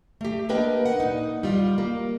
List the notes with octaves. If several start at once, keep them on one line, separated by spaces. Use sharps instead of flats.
A3 G4
A#3 D4 A#4 B4 D#5 G5
F#5
A#2 D#4
G3 F4
A#3